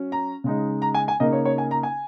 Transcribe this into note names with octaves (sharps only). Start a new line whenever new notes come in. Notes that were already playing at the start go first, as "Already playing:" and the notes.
Already playing: F#3 C#4
A#5
C#3 G#3 D#4
A#5
G#5
G#5
C#3 A#3 D#4 D#5
C#5
C#5
G#5
A#5
G#5